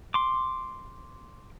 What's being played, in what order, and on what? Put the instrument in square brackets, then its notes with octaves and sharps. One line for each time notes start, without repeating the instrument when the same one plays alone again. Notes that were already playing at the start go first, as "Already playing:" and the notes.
[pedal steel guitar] C6 D6